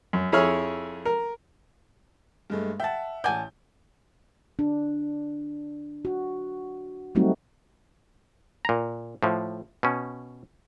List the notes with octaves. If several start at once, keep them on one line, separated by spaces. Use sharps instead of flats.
F#2
F2 E4 G#4 C#5 G#5 F6
A#4
G2 G#3 A3
E5 F#5 G5 A5
A1 D5 F#5 G#5 A5 G6
D4
F#4
F#3 G3 A3 C4 D#4 F#4
A#2 A#5
A2 F3
B2 C#4